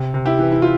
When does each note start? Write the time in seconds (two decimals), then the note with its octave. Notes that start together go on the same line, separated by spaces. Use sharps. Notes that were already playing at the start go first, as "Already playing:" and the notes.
Already playing: C3
0.14 C3
0.26 E4 G4
0.39 E3
0.52 E4
0.62 F4